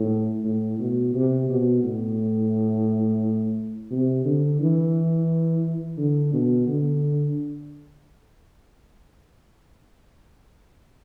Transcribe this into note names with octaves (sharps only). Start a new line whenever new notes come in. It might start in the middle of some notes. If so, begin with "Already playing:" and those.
Already playing: A2
A2
B2
C3
B2
A2
C3
D3
E3
D3
B2
D3